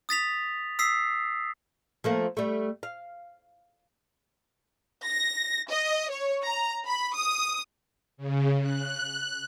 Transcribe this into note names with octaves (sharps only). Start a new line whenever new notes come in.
D#6 A6 B6 F7
D#6 E6 B6 C7
F3 A3 A#3
G3 A3
F5
A#6
D#5
C#5
A#5
B5
D#6
C#3
F#6